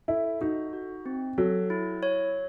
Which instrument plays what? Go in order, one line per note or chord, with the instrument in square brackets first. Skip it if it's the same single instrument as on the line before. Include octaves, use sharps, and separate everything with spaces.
[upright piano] E4 [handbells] A4
[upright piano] D#4 [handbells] F#4
[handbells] F#4
C4
[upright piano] F#3 [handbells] A4
[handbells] E4
C#5